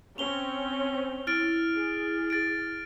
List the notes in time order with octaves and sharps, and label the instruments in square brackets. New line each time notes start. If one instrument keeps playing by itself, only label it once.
[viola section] C4 C#4 [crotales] F7 G7
[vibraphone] C5
[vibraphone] E4 [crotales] F6 A6 D7
[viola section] G#4
[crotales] A6 D7